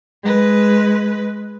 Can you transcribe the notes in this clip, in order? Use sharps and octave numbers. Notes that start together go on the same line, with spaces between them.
G#3 B4